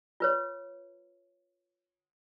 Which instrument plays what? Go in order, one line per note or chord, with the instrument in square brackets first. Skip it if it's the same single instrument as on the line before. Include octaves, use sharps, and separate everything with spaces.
[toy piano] F4 B4 C#5